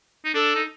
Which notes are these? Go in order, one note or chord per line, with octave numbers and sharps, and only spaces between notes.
D#4
D4 A4
D#4